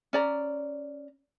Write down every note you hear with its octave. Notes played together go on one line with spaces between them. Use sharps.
C#4 D5 A#5